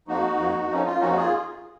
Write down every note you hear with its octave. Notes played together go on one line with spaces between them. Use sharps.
F2 F3 A#3 D#4 F#4
F2 F3 A#3
F2 F3 A#3 C#4 D#4
F4
F2 F3 A#3 C#4 D#4 F#4
F4 G#4